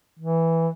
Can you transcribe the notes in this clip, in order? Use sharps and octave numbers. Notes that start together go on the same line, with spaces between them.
E3